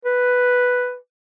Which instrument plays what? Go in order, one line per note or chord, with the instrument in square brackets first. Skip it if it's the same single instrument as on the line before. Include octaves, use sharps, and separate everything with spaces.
[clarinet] B4